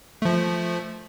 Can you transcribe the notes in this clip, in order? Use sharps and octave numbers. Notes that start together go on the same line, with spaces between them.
F3 A3